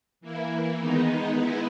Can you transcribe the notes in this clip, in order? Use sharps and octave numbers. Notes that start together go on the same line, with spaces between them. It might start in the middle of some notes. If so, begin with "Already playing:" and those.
E3 A#3 E4
D#3 G#3 B3 D#4
G#3 B3 E4